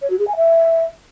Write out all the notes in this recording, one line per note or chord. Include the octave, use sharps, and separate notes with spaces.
C#5
F#4
G#4
G#5
E5